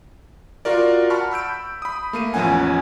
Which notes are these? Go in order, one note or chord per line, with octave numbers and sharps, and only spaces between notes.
F4 F#4 A#4 D5
F#5 A5 B5 C#6 F6
B5 E6 G6 D7
B5 D#6
A3 A#3 D#7
A1 E2 F3 C#4 F#5 G#5